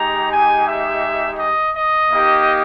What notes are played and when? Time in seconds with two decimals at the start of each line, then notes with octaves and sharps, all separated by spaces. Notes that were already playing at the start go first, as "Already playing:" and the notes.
Already playing: G#3 D#4 G4 A#5
0.30 G#5
0.67 E5
1.38 D#5
1.74 D#5
2.10 A#3 D#4 G4